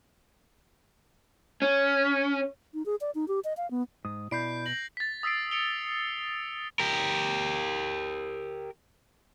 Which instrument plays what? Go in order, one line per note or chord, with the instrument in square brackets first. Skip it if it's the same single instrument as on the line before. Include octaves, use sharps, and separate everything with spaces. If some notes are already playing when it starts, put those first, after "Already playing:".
[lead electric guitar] C#4
[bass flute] D#4
G#4
D5
D#4
G4
D#5
F5
B3
[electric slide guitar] G#2 [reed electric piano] D#6
[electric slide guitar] B2 [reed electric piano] E4 D5 B5 [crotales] G6 C7 D7
[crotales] A#6 F#7
A6 B6
D#6 E6 B6 C7 D7
C#7 D7 F7 G7
[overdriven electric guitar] G4 A#4